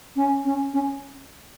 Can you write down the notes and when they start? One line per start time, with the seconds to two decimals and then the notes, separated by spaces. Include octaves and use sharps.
0.16 C#4
0.45 C#4
0.73 C#4